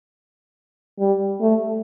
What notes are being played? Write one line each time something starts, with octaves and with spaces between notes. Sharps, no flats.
G3
A3